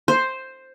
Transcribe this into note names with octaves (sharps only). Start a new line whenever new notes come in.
C5